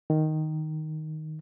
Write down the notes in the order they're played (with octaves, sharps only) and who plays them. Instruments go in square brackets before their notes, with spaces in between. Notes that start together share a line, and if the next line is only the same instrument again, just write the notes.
[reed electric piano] D#3